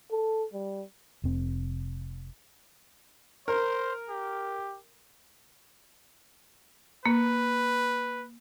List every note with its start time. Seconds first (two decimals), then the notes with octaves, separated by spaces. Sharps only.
0.11 A4
0.53 G3
1.24 F1 C4
3.48 A#4 C5
4.09 G4
7.06 A#3 B4